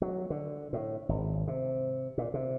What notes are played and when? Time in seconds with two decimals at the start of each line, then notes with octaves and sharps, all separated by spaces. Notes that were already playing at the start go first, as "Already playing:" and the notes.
0.02 F#3
0.30 D3
0.73 A2
1.09 G#1
1.48 C3
2.18 A#2
2.34 C3